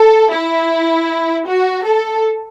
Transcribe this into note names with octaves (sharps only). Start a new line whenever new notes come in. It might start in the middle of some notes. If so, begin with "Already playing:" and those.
Already playing: A4
E4
F#4
A4